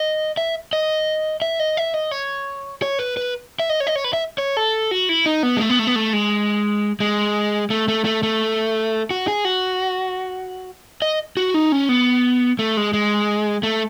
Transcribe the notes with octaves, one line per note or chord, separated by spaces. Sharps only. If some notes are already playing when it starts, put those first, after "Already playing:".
Already playing: D#5
E5
D#5
E5
D#5
E5
D#5
C#5
C#5
B4
B4
E5
D#5
C#5
D#5
C#5
B4
E5
C#5
A4
F#4
E4
D#4
B3
G#3
A3
B3
A3
B3
A3
G#3
G#3
A3
A3
A3
A3
F#4
G#4
F#4
D#5
F#4
D#4
C#4
B3
A3
G#3
G#3
A3